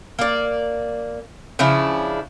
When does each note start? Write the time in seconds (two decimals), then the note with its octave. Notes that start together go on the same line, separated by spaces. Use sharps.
0.19 A#3 D5
1.59 C#3 F3 D4 E4